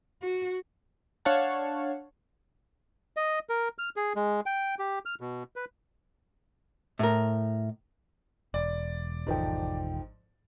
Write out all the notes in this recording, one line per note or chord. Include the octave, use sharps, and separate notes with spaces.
F#4
D4 C#5 F5 F#5 A5
D#5
A#4
F6
G#4
G#3
G5
G4
F6
B2
B4
A2 A#4
E1 D5
G#1 G#2 F3 A4 G5